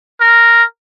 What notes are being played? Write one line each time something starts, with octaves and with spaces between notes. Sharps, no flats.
A#4